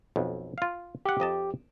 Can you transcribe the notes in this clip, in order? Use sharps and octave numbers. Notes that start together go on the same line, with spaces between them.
B1 F2
F4 F5
G4 E5 F#5
F2 D#5 A5